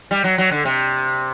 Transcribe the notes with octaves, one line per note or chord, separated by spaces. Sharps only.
G3
F#3
F#3
D3
C3